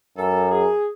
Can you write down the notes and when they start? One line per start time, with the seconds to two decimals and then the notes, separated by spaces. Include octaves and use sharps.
0.17 F#2 A4
0.51 G#4